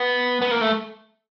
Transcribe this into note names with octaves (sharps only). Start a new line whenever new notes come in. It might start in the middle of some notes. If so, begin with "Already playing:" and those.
Already playing: B3
B3
A#3
A3